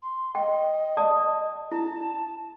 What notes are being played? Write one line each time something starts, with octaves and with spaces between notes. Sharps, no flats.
C6
D#5 G5
D5 A5 D#6
E4 A5